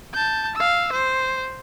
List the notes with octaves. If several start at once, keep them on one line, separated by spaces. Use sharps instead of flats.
A5 G6
F5 E6
C5